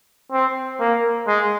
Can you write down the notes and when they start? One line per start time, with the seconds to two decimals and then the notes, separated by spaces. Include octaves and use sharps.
0.32 C4
0.80 A#3
1.27 G#3